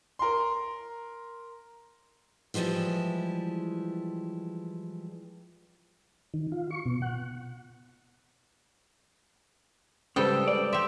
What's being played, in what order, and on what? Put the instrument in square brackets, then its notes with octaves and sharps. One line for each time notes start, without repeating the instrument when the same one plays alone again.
[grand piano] A#4 C6
[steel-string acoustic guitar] E3 F3 G3 G#3 E4
[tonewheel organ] D#3
F4
C#6
B2
F#5
[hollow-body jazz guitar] G#2 C#3 [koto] G3 A4 G5 [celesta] B4 C5 D#6
[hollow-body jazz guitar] D5
[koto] G4 E5 [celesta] C6